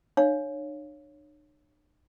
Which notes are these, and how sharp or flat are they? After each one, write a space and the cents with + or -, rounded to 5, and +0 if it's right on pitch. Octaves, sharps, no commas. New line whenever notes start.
D4 +45 C#5 +0 F5 +0